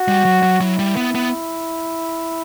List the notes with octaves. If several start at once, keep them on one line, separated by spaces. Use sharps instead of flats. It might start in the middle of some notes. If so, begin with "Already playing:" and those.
Already playing: F#4
G3
F#3
F#3
F#3 E4
G3
B3
B3